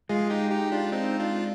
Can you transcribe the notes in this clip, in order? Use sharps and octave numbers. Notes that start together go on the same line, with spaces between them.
G#3 F4 G#4
D#4 G4
D#4 G4
D4 F4
C4 D#4
D4 F4